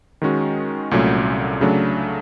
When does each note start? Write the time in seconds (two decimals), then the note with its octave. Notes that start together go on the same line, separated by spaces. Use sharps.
0.22 D#3 G#3 C#4 F#4
0.91 C2 A#2 F#3 A3 C#4
1.61 C#3 F#3 A3 D4